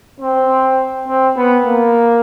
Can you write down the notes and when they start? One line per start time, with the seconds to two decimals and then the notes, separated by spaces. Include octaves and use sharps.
0.20 C4
1.08 C4
1.37 B3
1.65 A#3